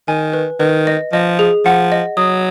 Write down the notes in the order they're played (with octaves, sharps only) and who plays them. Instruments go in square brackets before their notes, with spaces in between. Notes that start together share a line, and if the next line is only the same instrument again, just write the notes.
[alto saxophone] D#3 [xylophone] G#5
[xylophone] B4
[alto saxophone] D#3 [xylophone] B4
[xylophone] D#5
[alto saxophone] F3 [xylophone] D#5
[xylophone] G#4
[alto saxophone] F3 [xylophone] F#5
[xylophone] D#5
[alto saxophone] F#3 [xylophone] D#6